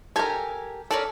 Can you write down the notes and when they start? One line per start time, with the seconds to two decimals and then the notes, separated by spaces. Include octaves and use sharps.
0.16 G4 A4 A#4 G#5
0.91 C#4 A4 A#4 D5